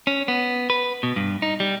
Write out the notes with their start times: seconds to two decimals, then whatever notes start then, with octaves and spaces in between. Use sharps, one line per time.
0.07 C#4
0.28 B3
0.70 B4
1.03 B2
1.16 G2
1.42 D#4
1.60 G3